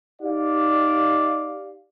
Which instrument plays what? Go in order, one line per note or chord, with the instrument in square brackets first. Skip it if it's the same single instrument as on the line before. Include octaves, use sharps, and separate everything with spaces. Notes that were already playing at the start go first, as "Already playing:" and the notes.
[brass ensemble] D#4 G4 D5 F5